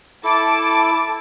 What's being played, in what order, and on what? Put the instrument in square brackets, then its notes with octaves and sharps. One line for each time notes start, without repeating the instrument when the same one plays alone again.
[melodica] E4 A4 [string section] A5 D6